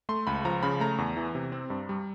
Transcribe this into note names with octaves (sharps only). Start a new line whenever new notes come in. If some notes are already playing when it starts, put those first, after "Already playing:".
A3 C6
C#2 B5
F3 A#5
C#3 B5
A3 A#5
E2
E3
C3
C4
G2
G3